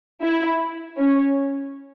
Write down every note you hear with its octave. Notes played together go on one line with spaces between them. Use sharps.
E4
C#4